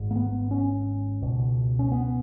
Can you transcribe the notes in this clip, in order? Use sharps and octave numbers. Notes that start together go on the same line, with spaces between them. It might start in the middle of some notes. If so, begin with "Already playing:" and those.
Already playing: G#1 G#2
A#3
B3
C#4
C#2 B2
C#4
B3